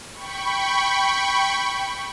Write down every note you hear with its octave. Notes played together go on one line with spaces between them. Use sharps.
G5 B5 C#6